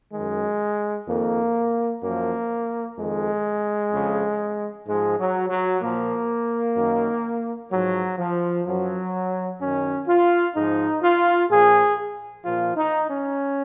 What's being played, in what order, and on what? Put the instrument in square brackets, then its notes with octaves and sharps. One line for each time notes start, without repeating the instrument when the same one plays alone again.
[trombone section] F#2 D#3 G#3
F2 D#3 A#3
F#2 F3 A#3
F2 D#3 G#3
F2 C#3 F3
G#2 F3 G#3
F#3
F#3
A#2 F3 A#3
F#2 D#3
G#2 F3 F#3
F3
F#2 F3 F#3
F#2 D#3 C#4
F4
G#2 F3 D#4
F4
A#2 F3 G#4
A#2 F3 F4
D#4
C#4